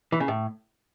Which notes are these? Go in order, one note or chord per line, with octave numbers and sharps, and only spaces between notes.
E3
C#3
A2